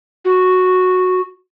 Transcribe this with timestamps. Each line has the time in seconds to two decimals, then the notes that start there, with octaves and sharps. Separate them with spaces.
0.25 F#4